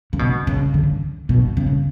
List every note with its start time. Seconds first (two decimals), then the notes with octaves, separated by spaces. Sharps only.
0.13 C#3
0.19 B2
0.47 C#3
0.74 D3
1.29 B2
1.57 C#3